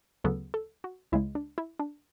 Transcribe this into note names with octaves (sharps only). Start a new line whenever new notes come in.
D2 C#3 F#3 B3 A4
A4
F#4
C#2 C#3 G#3 E4
D4
E4
D4